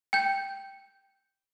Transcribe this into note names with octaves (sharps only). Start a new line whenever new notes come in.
G5 G6